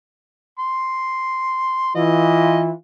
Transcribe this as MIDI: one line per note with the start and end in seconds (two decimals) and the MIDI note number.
0.59 1.94 84
1.95 2.71 52
1.95 2.71 65
1.95 2.60 75